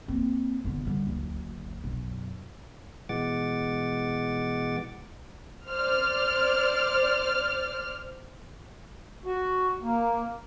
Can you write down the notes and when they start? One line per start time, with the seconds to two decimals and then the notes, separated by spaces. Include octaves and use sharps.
0.08 A#3 C4
0.64 E1 D3
0.85 D3 G3
1.07 F#1 D2
1.84 B1 F#2
3.09 B2 E3 G#3 F#5 D6 A6
5.69 C5 D5 F6
9.25 F#4
9.82 A#3